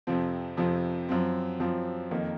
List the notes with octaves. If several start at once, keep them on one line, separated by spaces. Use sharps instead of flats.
F2 C3 F3 C4
F2 C3 F3 C4
F#2 F3 C4
F#2 F3 C4
F2 D#3 A#3